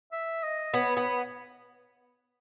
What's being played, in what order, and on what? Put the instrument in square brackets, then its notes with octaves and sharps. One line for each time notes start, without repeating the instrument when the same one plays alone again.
[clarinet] E5
D#5
[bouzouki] B3 [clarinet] C#5
[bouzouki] B3